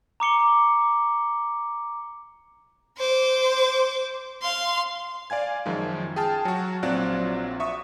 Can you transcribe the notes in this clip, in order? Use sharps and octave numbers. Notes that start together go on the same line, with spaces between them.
A#5 D6 C#7 G7
C5 D6
F5 C6
D5 F5 G#5 G#6
F#2 D#3 F3 G#3
G#4 G5 A5 F6
F#3 F#4
A#1 F#3 C4 F4 D5 F#6
E5 C#6 D#6